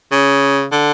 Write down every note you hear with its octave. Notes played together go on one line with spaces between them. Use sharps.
C#3
D3